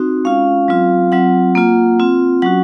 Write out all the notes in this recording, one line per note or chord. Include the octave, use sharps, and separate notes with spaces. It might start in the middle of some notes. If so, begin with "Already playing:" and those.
Already playing: C4 D#4 F#4
G#3 C#4 F4 F5
F#3 C4 F4
F#3 C4 F4 F#5
A#3 F4
C4 F4
F#3 C#4 F#4 F#5